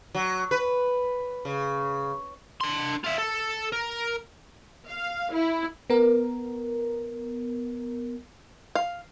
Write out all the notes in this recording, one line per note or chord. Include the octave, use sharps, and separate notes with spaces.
F#3
B4
C#3
D4 C6
F4 E5
A4
A#4
F5
E4
B3 A#4
F5